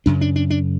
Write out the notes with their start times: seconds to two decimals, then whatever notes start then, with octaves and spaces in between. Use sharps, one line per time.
0.06 F#2 C#3 D4
0.21 D4
0.36 D4
0.50 D4